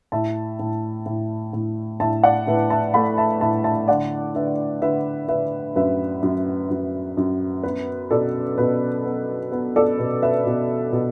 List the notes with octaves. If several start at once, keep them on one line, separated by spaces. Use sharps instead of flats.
A2 E5 A5
A2
A2
A2
A2 E5 A5
D5 F#5
A2 B4 E5
E5 A5
A3 F#5 B5
E5 A5
A2 E5 A5
E5 A5
D3 D5 F#5
D3 B4 E5
D3 B4 E5
D3 B4 E5
F#2 B4 E5
F#2
F#2
F#2
B3 B4
B2 A4 D5
B2 B4
B3
B3
A4 D5
B2 B4
B4 E5
B2
B2